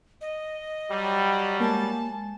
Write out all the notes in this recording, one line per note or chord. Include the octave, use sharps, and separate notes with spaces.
D#5
F#3 G3
G#3 A#3 A5